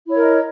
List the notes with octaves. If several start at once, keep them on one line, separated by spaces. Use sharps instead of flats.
E4 A#4 C#5 D#5